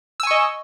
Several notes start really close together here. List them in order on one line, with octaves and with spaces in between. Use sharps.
E6 G#5 C#6 D#5